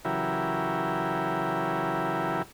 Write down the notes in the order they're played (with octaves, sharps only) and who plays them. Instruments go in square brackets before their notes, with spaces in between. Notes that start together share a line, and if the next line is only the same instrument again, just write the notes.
[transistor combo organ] C#3 E3 F#3 E4 G4 A#4